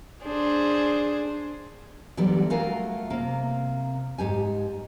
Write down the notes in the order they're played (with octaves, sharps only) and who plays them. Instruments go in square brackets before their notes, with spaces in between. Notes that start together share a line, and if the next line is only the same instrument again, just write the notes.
[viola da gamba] D4 G#4 C5
[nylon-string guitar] D3 E3 F#3 G3 B3 G4
A3 F4 F#4 A#4 F5 G#5
C3 A#3
G#2 G4 G#5